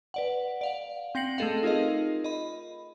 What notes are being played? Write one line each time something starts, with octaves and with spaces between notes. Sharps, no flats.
B4 D5 F#5
D5 F5 F#5
C4 G5 A#6 C7 C#7 F#7
A3 C4 G#4 A4 D#5 F5
D#4 F4 G#4 A#4 D#5
D#5 B5